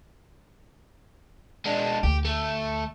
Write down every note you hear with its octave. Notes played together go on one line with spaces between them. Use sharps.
G#3 D4
D2 G4
A3